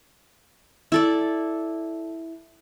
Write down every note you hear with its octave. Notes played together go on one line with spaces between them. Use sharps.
E4 A4 D5